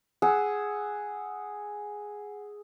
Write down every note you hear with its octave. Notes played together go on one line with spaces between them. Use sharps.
G#4 F#5 E6